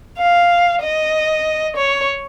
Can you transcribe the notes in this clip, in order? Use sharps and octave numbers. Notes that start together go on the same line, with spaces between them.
F5
D#5
C#5